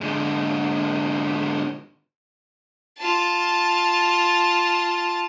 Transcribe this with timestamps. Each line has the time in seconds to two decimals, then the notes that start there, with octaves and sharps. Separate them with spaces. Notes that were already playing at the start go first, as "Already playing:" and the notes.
0.01 G#2 D3
2.98 F4 A5